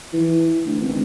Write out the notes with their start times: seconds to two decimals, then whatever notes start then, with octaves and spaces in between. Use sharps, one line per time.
0.13 E3
0.67 D2
0.82 G#1